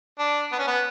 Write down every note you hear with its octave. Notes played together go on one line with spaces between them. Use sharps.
D4
B3
C#4
B3